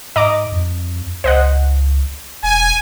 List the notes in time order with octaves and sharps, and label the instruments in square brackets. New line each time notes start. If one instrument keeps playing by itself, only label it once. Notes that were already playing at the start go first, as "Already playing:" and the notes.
[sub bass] G#2 [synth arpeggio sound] D#5 A#5 D6
[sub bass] F2
[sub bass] C#2 [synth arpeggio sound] C5 D#5 F#5
[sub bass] E1 [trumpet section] G#5